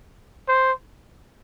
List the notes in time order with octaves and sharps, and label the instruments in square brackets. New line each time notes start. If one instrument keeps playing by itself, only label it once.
[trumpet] C5